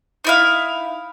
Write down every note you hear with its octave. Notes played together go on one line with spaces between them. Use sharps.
D#4 E4 F5